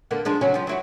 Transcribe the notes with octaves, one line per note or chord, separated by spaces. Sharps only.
D3 A#3 B3
F3 G#3 D4
C#3 F#3 C#4
F3 G3
F#3 E4 F#4